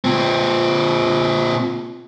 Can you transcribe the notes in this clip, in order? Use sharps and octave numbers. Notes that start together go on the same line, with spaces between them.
A#2 C4